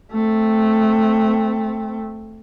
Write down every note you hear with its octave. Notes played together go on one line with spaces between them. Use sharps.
A3 C4